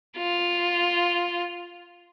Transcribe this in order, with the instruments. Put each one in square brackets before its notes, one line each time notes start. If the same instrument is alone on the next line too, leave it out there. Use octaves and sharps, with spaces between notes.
[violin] F4